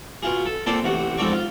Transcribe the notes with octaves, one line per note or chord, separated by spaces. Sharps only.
B2 F4 G#4
A4
A#2 C4 A4 D5 A5 C6
A1 C3 F#4
F2 G#2 C4 A4 D5 C#6
F4